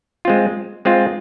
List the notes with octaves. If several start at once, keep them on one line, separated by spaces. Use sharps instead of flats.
G#3 C4 F4
G#3 C4 F4